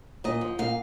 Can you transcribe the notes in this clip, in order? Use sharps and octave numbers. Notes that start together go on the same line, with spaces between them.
A#2 D#5
F3
A#2 F5